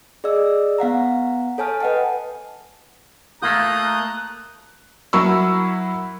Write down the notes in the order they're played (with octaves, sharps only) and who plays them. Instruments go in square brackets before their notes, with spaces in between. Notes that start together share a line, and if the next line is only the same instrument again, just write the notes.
[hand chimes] G#4 D5 D#5 E6
B3 F5 F#5 A#5
A4 C#5 G#5 A5 F6
B4 D#5 F#5 G5 A5
[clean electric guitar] A3 A#3 F4 [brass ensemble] A5 A#5 [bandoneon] D#6 G6 [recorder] F#6
[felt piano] F#3 E4 A#4 B5 C#6 E6